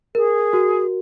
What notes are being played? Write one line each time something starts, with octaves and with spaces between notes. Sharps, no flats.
G#4 A#4
F#4